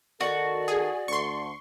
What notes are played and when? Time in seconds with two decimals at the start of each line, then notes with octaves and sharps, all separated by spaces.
0.21 D#3 F#4 A4 D5
0.68 G#4
1.08 D2 D3 C6 C#6